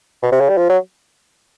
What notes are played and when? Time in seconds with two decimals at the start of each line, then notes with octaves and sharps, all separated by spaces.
0.23 B2
0.32 C3
0.41 C#3
0.49 G3
0.58 F3
0.70 F#3